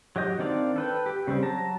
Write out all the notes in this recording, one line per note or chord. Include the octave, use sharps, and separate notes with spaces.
F#3 G4 D#5 G6
D#3 C4 D4 D5 F5
A4 B4 G5
G4
C#3 G3 C4
F#3 A5 A#5